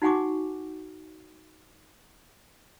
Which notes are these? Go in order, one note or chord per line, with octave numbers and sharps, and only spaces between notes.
D#4 F#4 F#5 G#5 C#6 D6